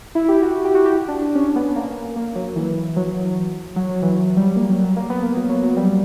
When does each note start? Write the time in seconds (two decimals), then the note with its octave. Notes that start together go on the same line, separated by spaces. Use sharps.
0.15 E4
0.29 G4
0.42 F#4
0.65 G4
0.75 F#4
0.86 G4
1.08 D4
1.22 D4
1.35 C#4
1.56 B3
1.76 A#3
2.16 A#3
2.35 F#3
2.56 E3
2.96 F#3
3.76 F#3
3.89 F#3
4.02 E3
4.16 F#3
4.37 G3
4.56 A#3
4.69 F#3
4.83 F#3
4.96 A#3
5.10 B3
5.23 A#3
5.36 F#3
5.49 F#3
5.63 F#3
5.77 G3